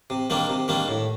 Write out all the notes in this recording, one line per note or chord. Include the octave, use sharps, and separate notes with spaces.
C3
D#3 G3 A#3 D4
C3
D#3 G3 A#3 D4
A2